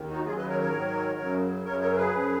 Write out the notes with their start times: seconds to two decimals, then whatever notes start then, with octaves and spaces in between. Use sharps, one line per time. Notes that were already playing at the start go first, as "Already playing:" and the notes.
Already playing: D#2 D#3
0.10 D#4 F#4
0.25 D#2 C#3 F#3 F4 G#4
0.36 B4 D#5
0.49 A#4 C#5
0.60 A#4 C#5
0.72 G#2 D#3 F#3
1.19 F#2 C#3 F#3
1.65 F#2 C#3 F#3 A#4 C#5
1.80 A#4 C#5
1.91 A#4
1.96 G#4 B4
2.12 F#2 F3